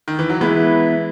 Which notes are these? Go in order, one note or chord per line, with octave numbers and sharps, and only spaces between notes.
D#3
E3
F#3
E3 G#3 B3 E4 B4